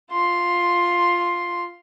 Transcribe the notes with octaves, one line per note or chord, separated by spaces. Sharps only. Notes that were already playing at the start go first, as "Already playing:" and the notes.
F4 C6